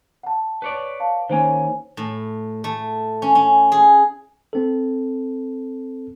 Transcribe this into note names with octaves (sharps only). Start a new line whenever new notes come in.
F#5 A5
B4 C#5 D5
F5 A5
D#3 A#3 C#4 C5 G#5
A2
A3
C#4
C#4
G#4
C4 A4